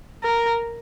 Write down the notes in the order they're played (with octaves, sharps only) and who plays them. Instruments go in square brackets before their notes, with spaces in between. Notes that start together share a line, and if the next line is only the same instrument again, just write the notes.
[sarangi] A#4